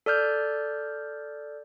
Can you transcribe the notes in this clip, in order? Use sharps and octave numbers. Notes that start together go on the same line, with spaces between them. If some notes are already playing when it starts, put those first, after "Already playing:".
A4 D5 F6 G6